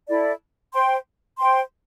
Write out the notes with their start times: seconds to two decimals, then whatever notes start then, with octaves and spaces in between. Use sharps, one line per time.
0.09 E4 A4 D5
0.73 C5 G5 C6
1.37 C5 G5 C6